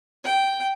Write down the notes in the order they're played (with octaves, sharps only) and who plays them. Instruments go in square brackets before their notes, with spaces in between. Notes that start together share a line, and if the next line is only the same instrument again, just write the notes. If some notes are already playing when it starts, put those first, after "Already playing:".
[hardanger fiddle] G5